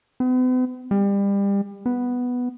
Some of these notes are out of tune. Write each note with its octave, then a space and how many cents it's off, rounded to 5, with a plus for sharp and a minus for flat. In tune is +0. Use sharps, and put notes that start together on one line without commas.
B3 +45
G3 +30
B3 +0